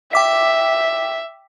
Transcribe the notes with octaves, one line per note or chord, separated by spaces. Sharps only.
E5 G5 D6 B6